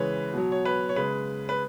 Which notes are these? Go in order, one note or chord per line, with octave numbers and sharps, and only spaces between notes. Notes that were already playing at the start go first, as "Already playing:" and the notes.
Already playing: C#3 E3 G#3 B4 C#5
B2 F#3
C#5
B4
C#5
C#3 G#3 B4
B4